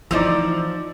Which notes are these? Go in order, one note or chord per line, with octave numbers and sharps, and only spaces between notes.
E3 F3 C4 D#4 D5 E6